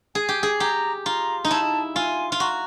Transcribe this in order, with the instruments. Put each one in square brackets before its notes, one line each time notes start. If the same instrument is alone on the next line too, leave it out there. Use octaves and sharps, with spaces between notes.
[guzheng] G#4 [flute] G#5
[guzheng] G4
G#4
[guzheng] G4 [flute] A#5
[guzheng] F4 [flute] A#5
[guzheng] D#4
[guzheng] E4 [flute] A5
[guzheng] F4 [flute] G#5
[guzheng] F4
[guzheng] F#4 [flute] A#5